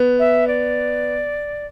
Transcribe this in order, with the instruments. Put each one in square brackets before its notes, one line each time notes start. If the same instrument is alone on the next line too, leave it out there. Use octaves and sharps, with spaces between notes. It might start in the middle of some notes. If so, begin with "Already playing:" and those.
Already playing: [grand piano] B3
[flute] E5
D5